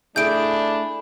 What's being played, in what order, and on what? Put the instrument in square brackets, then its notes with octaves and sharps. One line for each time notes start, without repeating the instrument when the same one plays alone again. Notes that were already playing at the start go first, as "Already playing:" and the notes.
[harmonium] A3 [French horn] D4 [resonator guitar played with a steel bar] E4 G#4 [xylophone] G6 D7